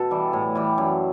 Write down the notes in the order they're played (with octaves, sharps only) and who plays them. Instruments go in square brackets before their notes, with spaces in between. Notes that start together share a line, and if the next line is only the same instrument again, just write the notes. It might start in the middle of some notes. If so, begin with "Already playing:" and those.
Already playing: [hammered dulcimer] B2 A4
E3 G3
A2
E3 G3
F#2